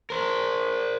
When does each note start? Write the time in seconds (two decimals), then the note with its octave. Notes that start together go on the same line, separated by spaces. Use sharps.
0.10 A#4 C5